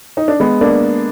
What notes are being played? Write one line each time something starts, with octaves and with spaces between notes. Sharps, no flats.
D#4
D4
G#3 B3
A#3 D4